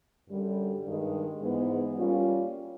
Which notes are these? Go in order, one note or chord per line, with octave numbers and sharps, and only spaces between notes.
F#2 D3 G3
G2 D#3 G#3
G#2 E3 G#3 B3
G3 A#3 C#4 F4